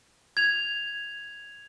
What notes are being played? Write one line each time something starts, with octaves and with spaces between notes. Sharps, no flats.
G#6 F7